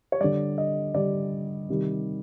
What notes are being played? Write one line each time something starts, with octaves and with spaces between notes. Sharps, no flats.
C#5
D3 G3 D5
D#5
D3 G3 D5
C3 D#3 G3